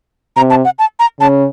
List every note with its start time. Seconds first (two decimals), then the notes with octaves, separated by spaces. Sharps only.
0.36 C3 A#5
0.50 A5
0.65 F#5
0.79 A5
0.99 A#5
1.21 C#3 A5